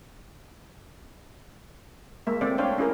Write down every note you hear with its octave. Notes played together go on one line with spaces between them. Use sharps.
G#3 A#3 E5
A3 C4 D5
D4 C5 C#5 F5 G5
C#4 E4 G#4 A#4